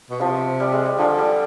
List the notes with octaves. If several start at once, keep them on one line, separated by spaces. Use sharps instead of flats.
B2
C3 F3
G3
G#3
G3
D3 F3
G3